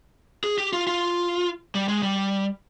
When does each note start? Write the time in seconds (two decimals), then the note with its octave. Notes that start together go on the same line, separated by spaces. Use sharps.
0.44 G#4
0.58 G4
0.73 F4
0.87 F4
1.75 G3
1.88 G#3
2.03 G3